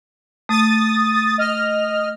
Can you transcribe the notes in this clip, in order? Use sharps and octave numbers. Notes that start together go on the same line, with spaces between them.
A3 D#6 A6
D#5 F6